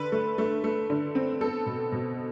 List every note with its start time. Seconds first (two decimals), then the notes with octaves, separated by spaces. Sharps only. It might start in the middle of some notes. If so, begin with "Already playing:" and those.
Already playing: D3 B4
0.12 A3
0.38 A3
0.64 A3
0.90 D3
1.15 C4
1.41 B3 A4
1.66 B2
1.92 B2